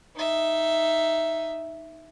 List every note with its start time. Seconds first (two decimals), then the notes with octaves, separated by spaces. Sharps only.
0.16 D#4 E5